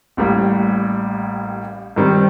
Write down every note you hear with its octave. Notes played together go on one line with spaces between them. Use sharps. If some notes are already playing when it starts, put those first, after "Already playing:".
A1 A2 G3 A#3
G2 D#3 G3 C4